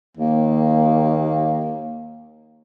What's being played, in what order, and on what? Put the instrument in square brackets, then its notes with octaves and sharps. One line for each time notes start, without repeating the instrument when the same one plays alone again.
[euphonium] D#2 [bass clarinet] A#3